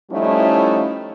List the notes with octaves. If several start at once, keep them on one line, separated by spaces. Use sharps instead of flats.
F3 G3 A3 C#4 D#4 E4